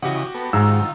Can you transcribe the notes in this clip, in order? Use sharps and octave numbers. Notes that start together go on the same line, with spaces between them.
C#3 E3 F#4 G4 D#5 F#5
B3 A4
G#2 D#3 F4 A#5 E6